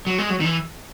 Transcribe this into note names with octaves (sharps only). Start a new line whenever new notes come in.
F#3
G#3
F#3
D#3
E3